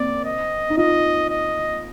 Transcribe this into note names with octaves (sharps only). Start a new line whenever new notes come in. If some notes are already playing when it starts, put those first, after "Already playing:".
Already playing: A#3 C4 D5
D#5
D#4
F4 D#5
D#5